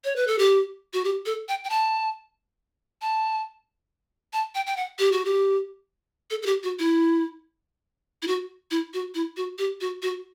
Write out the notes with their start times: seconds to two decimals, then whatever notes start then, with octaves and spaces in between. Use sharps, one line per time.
0.04 C#5
0.16 B4
0.27 A4
0.39 G4
0.93 F#4
1.04 G4
1.26 A4
1.49 G5
1.64 G5
1.70 A5
3.02 A5
4.33 A5
4.55 G5
4.67 G5
4.76 F#5
4.99 G4
5.12 F#4
5.25 G4
6.31 A4
6.43 A4
6.46 G4
6.63 F#4
6.79 E4
8.22 E4
8.27 F#4
8.71 E4
8.94 F#4
9.15 E4
9.37 F#4
9.58 G4
9.81 F#4
10.02 F#4